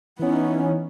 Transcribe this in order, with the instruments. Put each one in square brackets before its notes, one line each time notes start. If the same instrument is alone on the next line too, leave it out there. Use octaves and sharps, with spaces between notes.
[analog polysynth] E3 C#4 [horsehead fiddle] B3 D#4